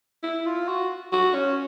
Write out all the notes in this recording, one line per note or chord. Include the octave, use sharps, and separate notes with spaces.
E4
F4
F#4
F#4
C#4